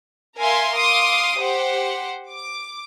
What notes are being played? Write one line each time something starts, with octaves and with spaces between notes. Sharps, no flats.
A#4 E5 F5 G#5 C6
F5 C6 D6 D#6
G4 C5 F#5
D6